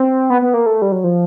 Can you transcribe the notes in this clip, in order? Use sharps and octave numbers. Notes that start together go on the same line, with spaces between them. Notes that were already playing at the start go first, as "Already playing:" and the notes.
Already playing: C4
B3
B3
A#3
A3
G3
F#3
F3